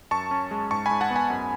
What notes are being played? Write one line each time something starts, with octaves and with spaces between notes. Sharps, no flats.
F#2 A5 C#6
C#4
G#3
G#2 A5 C#6
G#5 B5
G#2
F#5 A5
B3
G#5 B5
F#2